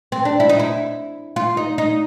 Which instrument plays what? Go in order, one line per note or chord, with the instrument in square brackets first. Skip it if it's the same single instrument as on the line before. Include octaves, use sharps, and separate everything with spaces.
[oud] C4
D4
E4
D#4
E4
F4
D#4
D#4